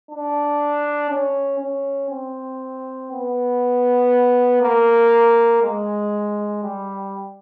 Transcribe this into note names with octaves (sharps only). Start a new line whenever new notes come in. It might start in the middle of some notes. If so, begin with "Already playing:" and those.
D4
C#4
C#4
C4
B3
A#3
G#3
G3